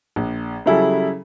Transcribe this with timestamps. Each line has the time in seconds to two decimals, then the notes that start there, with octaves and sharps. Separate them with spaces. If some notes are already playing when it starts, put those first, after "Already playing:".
0.16 A#1
0.66 C#3 F#3 G3 E4 G#4 A4